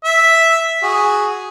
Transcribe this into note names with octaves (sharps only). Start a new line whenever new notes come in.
E5
F#4 G#4